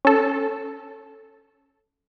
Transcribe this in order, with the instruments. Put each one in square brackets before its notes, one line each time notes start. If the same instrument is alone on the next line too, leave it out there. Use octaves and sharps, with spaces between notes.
[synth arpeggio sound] C#4 A4